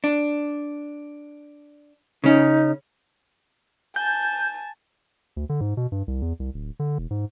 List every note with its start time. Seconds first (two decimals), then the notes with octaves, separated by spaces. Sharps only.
0.04 D4
2.24 C#3 C#4 D#4
3.96 G#5 A5 G6
5.36 D2
5.49 D3
5.61 G#2
5.77 B2
5.92 G2
6.08 C2
6.21 E2
6.40 C2
6.54 D1
6.79 D3
6.98 E1
7.11 G#2